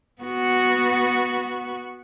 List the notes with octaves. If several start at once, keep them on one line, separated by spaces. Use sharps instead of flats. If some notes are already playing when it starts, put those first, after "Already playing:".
B3 F#4